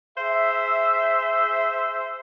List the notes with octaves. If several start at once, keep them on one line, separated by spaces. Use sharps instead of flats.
G#4 C5 E5